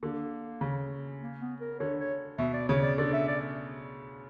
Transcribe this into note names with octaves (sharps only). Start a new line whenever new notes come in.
D3 A#3
C#3
A#3
B3
A#4
D3 C#5
C#5
B2 E5
D5
C#3 C#5
D5
D3 D5
E5
D5